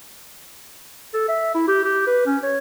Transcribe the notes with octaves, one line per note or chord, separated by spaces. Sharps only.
A4
E5
E4
G4
G4
B4
C#4
C#5